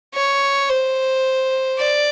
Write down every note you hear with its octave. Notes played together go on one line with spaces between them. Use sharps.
C#5
C5
D5